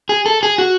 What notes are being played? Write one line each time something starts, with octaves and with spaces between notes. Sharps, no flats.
G#4
A4
G#4
F#4